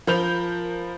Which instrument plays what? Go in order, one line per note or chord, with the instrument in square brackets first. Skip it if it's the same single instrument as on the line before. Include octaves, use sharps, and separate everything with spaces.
[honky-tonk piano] F3 A#4 B5 G6 F7